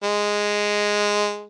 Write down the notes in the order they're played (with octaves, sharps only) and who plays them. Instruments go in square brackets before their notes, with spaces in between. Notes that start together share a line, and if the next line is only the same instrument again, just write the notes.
[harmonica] G#3